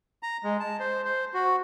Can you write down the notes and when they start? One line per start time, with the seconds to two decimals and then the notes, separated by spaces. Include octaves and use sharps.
0.23 A#5
0.44 G#3
0.60 A5
0.80 C5
1.05 C5
1.34 F#4